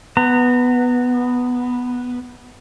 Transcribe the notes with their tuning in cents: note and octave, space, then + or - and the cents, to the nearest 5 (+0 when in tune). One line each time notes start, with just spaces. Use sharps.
B3 +0 A#5 -30